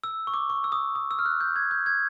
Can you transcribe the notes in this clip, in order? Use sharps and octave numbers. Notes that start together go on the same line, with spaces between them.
E6
C#6
D6
C#6
E6
D#6
D#6
E6
F6
F#6
G6
G#6
G6
G#6